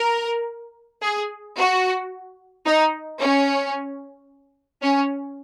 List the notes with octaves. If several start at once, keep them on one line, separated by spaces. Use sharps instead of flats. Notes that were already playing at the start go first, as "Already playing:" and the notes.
Already playing: A#4
G#4
F#4
D#4
C#4
C#4